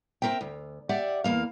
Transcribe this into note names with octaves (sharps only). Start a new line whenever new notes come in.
C4 C#4 A#4 E5 G5
D2
G4 D5 E5 F#5
E2 C3 A#3 F5